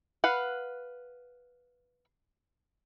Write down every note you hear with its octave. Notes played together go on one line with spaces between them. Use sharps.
B4 F5 F#5